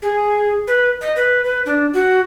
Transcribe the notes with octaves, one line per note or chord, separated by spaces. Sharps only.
G#4
B4
D#5
B4
B4
D4
F#4